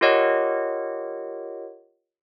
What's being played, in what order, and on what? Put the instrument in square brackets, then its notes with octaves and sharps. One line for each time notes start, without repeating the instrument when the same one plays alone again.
[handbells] F4 G4 A#4 C#5 D#5 F#5